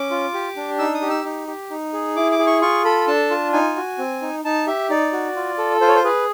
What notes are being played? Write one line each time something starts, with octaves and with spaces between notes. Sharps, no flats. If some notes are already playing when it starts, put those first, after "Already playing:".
Already playing: C#4 D6
F4
G4
D4
D#4 E6
D#6
G4
E6
D#4
G4
D#4
G#4
E4 D6
D6
G#4
C#6
F4 C#6
A4 B5
D4 A5
F4
D#4 G#5
F#4
C4
D#4
D#4 A5
G4 E5
D#4 D5
F#4
F4
A4
F4 C5
C#5
C5
G#4 B4